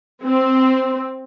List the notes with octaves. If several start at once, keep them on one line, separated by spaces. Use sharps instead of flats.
C4